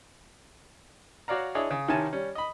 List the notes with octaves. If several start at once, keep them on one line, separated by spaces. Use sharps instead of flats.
F#4 C#5 D5 F5 A#5
D4 E4 G#4 C#5 D#5
C#3
C3 D#3 C#4 E4 G#5 A5
G3 C#4
D#5 B5